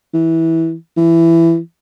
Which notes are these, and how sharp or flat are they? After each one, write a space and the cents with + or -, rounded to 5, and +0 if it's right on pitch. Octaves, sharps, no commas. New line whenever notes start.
E3 -15
E3 +15